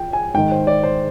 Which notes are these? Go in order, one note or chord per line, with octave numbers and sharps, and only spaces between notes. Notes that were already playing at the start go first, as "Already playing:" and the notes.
Already playing: F3 G5
G#5
G#2 D#3 G5
C5
D5
C5